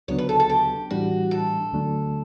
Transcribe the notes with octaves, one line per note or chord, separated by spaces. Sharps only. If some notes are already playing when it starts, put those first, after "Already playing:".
D2 C#3 F#3 B3 D4 C#5
B4
A4
A4
G4
A2 E3 G3 D4 F#4
A4
D2 D3 F#3 A3 D4